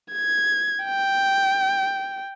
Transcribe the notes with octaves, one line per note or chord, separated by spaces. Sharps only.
G#6
G5